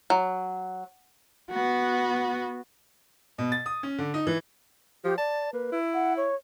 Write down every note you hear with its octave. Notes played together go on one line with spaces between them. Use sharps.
F#3
B3 F#4
B2
A6
D#6
C#4
D3
D#4
E3
F3 G4
D5 A5
A#3 B4
E4
F#5
C#5